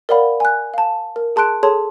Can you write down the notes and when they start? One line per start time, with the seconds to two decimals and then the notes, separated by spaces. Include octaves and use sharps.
0.09 A#4 C#5 D5 F5 F#5 B5
0.40 G#5 F#6
0.74 F5 A5
1.16 A#4
1.36 G#4 A5 C6 F#6 D7
1.63 G#4 A4 C#5 A5 C6